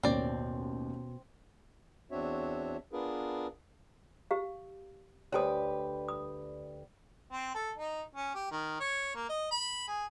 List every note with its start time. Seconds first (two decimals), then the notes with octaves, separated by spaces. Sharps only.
0.03 A1 D#2 B2 C4 C#5 D5
2.11 E2 C4 D4 F#4 C#5 E5
2.93 B3 D4 F4 G#4 A#4 B4
4.31 G4 F5
5.32 D2 G4 B4 C#5 G#5 D#6
6.08 D#6
7.32 C4
7.54 A4
7.78 D#4
8.15 C#4
8.34 G4
8.51 D#3
8.80 C#5
9.15 A#3
9.29 D#5
9.51 B5
9.87 G#4